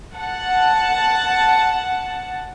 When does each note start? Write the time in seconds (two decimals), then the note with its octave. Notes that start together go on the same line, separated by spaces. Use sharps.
0.15 F#5 A5